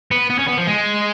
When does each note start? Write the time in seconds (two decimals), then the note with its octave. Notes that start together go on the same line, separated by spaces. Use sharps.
0.12 B3
0.30 B3
0.39 C#4
0.48 B3
0.58 F3
0.67 G#3